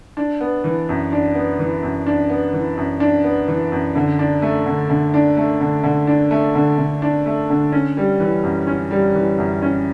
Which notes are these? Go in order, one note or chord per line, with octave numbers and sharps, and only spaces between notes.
D4
B3
E3
F#2
D4
B3
E3
F#2
D4
B3
E3
F#2
D4
B3
E3
F#2
D3
D4
A3
D3
D3
D4
A3
D3
D3
D4
A3
D3
D3
D4
A3
D3
C#4
G3
E3
F#2
C#4
G3
E3
F#2
C#4